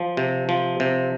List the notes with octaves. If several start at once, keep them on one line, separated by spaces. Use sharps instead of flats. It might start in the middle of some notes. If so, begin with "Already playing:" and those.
Already playing: F3
C3
F3
C3